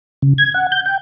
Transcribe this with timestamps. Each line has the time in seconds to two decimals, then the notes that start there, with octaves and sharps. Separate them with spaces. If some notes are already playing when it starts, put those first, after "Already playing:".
0.22 C#3
0.38 G#6
0.54 F#5
0.72 G6
0.86 G5